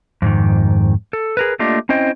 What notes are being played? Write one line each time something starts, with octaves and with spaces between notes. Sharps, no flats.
F2 G#2 D#3
A4
G#4 A#4 B4
A3 A#3 D4 F4 G4 D#5
C4 C#4 E4 C5 D#5 G5